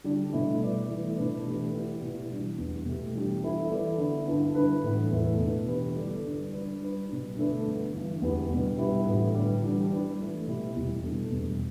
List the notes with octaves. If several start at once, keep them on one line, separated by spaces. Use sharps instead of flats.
D3 G3 D4
B2 A3 E4
G3 E4 B4 D5
E3 A3 E4
B2 A3 D4 B4 D5
E3 A3 G4 B4
E3 B3 E4 G4 D5
B2 B3 E4 G4
E3 G3 D4
E2 E3 G3 B3
B2 A3 G4
E3 G3 D4 G4
E3 B3 E4 A4
E3 B3 E4 A4 D5
D3 B3 E4
G2 D3 B3 E4
D3 G3 E4 B4
A2 E3 B3
E2 E3 A3
B2 B3 D4
E3 B3 G4 B4
D3 G3 D4 A4 D5
G2 D3 G3 D4
G3 D4 B4 D5
G3 D4 B4
B2 G3 D4
G2 D3 A3 D4 B4
G2 D3 B3
G2 E3 G3
E2 D3 B3 G4 B4
B2 G3 B3
G2 G3 E4 G4 B4
A2 E3 B3 G4
G2 D3 G3
E3 G3 B3 D4 G4
G3 D4 B4 D5
E3 A3 E4
B2 B3 E4 G4
E2 B2 G3 E4 G4
B2 G3 D4 A4
E2 B2 G3